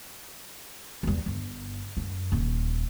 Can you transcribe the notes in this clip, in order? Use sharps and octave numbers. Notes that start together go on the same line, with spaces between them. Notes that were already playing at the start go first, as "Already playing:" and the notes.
E2 G3
G1
F#2
D#1